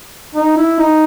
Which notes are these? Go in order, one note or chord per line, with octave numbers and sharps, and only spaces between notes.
D#4
E4
D#4